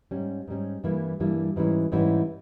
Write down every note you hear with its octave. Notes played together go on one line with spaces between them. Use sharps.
G#2 G3 C#4
G#2 G3 C#4
G2 E3 G3 A#3 E4
G2 E3 G3 A#3 E4
G#2 E3 G3 C#4 E4
G#2 E3 G3 C#4 E4